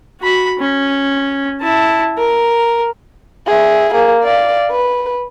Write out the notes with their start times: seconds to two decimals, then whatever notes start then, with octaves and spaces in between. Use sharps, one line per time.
0.21 F#4 B5
0.59 C#4
1.61 E4 A5
2.17 A#4
3.47 G#4 E5
3.94 A#3 G#4
4.23 D5 F5
4.71 B4